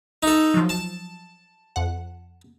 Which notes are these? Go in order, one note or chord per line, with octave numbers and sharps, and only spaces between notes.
D#4 A4
F3 F#3
A5
F2 F#5